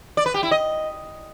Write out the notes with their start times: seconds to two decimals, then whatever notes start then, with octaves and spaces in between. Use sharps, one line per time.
0.17 D5
0.26 B4
0.34 G4
0.43 E4
0.51 D#5